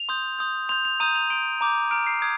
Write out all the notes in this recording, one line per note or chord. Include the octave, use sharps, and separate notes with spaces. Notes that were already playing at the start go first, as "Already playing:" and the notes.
Already playing: F7
C6 D#6 G6
C6 D#6 G6
C6 G6 F7
F7
A#5 D#6 G6 D#7
F7
C6 G6 D7
A#5 D6 G6
A#5 F6 D7
C7
D#6 G6 G#6